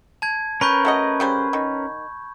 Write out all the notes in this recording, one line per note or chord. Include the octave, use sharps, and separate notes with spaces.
A5 G#6
C#4 A#4 B4 B5 C#6 G6
A3 F#4 D#5
C#3 G3 C5
D#3